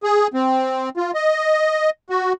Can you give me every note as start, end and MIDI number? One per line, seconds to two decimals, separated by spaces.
0.03 0.27 68
0.34 0.89 60
0.97 1.11 65
1.14 1.90 75
2.10 2.33 66